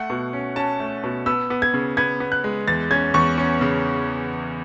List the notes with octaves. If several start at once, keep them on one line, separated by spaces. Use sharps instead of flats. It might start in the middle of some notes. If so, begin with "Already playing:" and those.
Already playing: A3 F#5
B2
C#4
C#4 A5
A3
B2
B3 E6
B3
G#6
C#3
B3 G#6
B3
F#6
G#3
E2 A6
C#4 G#6
E2 C#6
C#4
C#3